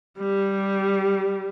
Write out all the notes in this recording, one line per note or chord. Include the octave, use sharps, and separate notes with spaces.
G3